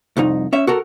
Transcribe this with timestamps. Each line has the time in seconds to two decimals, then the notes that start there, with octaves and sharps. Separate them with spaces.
0.17 C2 F2 D#4
0.53 C#4 E5
0.67 F#4 A4 A#4